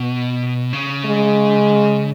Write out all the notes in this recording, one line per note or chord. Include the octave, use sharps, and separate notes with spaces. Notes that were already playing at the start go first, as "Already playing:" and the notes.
Already playing: B2
C#3
G#3